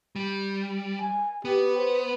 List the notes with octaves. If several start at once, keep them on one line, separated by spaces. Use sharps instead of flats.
G3
G#5
B3 G4
C5